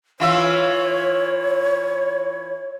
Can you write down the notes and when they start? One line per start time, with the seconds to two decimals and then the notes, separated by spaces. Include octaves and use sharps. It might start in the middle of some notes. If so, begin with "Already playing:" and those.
0.20 E3 F4 C#5 E5